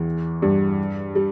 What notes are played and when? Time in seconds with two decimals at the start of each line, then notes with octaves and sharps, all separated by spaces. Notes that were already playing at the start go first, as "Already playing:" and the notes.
Already playing: E2 E3
0.42 G2 G3
1.15 G3